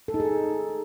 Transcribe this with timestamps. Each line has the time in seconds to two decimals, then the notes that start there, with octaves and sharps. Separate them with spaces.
0.08 A4
0.14 D#4
0.20 G#4